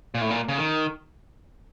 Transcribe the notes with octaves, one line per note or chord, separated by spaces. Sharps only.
A#2
A2
A#2
C#3
D#3